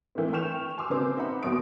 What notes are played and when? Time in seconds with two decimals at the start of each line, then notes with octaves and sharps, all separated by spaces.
0.15 D#3 E3 A3 A#3 C4
0.33 G5 C#6 F6 G6 E7 F7
0.78 G#5 C6 D6 E6
0.90 C#3 A#3 C4 F#4 C5 D6
1.17 D#4 E5 F#5 B5
1.43 D#2 B2 F#3 C#6 D#6 D7